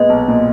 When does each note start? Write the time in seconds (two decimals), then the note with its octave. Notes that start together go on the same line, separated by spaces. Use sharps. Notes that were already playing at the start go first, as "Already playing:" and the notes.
Already playing: A#2 G#3 B3 D#5
0.09 B1
0.28 A#2